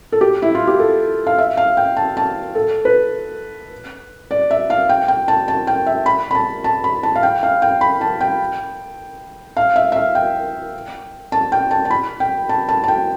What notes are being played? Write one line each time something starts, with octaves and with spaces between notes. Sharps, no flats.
A4
G4
E4
F4
G4
A4
F5
E5
F5
G5
A5
A5
A4
B4
D5
E5
F5
G5
G5
A5
A5
G5
E5
B5
B5
A5
A5
B5
A5
F5
G5
F5
G5
B5
A5
G5
F5
E5
E5
F5
G5
A5
G5
A5
A5
B5
G5
A5
A5
A5
G5